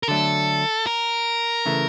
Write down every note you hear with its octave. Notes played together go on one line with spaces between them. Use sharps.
A#4
D3 F#3 A3 D4 A4
A#4
C#3 E3 A3